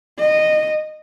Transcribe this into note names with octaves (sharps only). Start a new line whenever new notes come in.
D#5